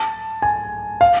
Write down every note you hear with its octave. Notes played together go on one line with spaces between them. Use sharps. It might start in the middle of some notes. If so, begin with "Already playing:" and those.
Already playing: A5
G#5
F5